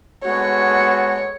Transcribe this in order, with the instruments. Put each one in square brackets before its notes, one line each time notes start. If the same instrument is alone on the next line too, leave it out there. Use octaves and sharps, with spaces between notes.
[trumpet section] G#3 B3 F#4 A4 [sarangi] C#5